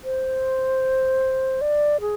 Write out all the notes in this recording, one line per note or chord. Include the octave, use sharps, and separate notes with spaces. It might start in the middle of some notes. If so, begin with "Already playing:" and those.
C5
D5
G#4